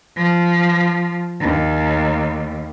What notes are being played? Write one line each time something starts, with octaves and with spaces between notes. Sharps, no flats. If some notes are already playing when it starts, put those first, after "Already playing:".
F3
D#2